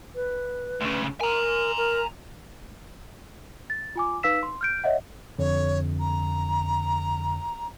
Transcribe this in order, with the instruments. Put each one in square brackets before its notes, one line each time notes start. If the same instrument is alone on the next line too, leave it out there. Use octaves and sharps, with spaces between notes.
[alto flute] B4
[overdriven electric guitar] D2 C#3
[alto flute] A#4 [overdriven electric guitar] G#5 A#5
[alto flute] A#4
[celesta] A6
F4 G#5 D6
D#4 B4 F5 E6 B6 E7
C6
F6 G6 D7
C#5 D#5 E5 F#5
[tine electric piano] F2 D3 [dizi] C#5
[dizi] A#5